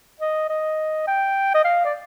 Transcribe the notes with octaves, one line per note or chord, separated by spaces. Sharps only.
D#5
D#5
G5
D#5
F5
D5